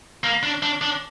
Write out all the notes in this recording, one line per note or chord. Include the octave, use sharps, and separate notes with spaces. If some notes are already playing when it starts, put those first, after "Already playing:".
A#3
D4
D4
D4